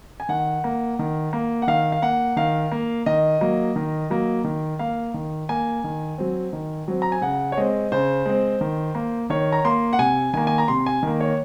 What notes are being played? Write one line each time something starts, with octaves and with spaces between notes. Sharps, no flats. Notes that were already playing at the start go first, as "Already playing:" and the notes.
G#5
D#3 F#5
A#3
D#3
A#3
F#5
D#3 F5
F5
A#3 F#5
D#3 F5
A#3
D#3 D#5
F#3 A#3
D#3
F#3 A#3
D#3
A#3 F5
D#3
A#3 G#5
D#3
F#3 C4
D#3
F#3 C4
A#5
G#5
C#3 F#5
C#5
G#3 C4 D#5
C#3 C5
G#3 C4
D#3
A#3
D#3 C#5
A#5
A#3 C6
F#5
C3 G#5
D#3 A#3 G#5
G#5
A#5
C3 C6
G#5
D#3 A#3
C#5